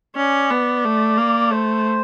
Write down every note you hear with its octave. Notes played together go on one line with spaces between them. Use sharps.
C#4 D5
B3
A3
A#3
A3 C5